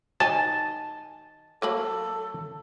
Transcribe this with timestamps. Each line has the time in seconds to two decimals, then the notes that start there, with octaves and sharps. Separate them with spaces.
0.20 D#3 D#4 G#5 A5
1.62 F#3 A#3 A4 B5